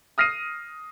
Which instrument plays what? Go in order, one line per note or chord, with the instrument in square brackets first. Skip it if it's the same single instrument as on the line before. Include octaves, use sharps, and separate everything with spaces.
[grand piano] D#6 F6 A#6 C7 D#7